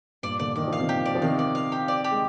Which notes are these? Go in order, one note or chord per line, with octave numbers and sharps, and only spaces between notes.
G2 A#2 D5
A#2 D3 D5
D#3 D5
F3
F5
C3 D#3
G4
D5
F3
C3 D#3 F5
D5
F5
G4
D5
G4
G#3